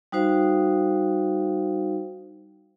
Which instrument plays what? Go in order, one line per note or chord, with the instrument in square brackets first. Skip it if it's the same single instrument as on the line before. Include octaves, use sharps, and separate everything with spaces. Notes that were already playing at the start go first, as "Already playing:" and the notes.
[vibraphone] G3 D#4 F#4 C5 F5